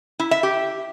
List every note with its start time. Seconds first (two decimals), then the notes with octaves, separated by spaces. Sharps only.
0.19 E4
0.31 E5
0.43 G4